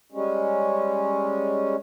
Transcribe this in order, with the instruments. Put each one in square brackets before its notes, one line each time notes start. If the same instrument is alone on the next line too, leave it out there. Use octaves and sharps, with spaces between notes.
[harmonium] G3 G#3 C#4